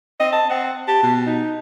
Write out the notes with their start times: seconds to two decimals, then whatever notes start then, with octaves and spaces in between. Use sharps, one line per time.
0.20 C4 D#5
0.33 A5
0.50 C4 F#5
0.88 G4 A5
1.02 B2
1.26 D#4